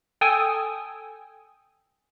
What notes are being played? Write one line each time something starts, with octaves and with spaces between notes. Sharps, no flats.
A4 G5 G#5 D#6 E6